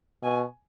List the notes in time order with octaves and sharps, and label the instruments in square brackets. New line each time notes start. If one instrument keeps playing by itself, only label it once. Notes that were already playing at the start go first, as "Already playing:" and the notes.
[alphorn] B2 [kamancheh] G#5